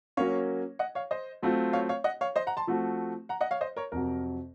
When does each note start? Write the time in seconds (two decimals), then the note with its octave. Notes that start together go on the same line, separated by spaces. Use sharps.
0.17 F#3 A#3 C#4 C#5 F5
0.79 D#5 F#5
0.95 C#5 F5
1.11 C5 D#5
1.43 F#3 A3 C4 F4
1.73 C#5 F5
1.89 C#5 F5
2.04 D#5 F#5
2.21 C#5 F5
2.36 C5 D#5
2.47 F#5 A#5
2.57 A5 C6
2.67 F3 A3 C4 F#4
3.29 F#5 A#5
3.41 D#5 F#5
3.51 C#5 F5
3.61 C5 D#5
3.77 A#4 C#5
3.92 F2 C3 F#3 A#4